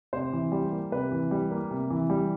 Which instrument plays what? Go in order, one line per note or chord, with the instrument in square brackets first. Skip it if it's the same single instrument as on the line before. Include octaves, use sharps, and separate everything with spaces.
[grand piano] C3 C5
E3
G3
A#3
C3 B4
E3
G3
A#3
C3
E3
G3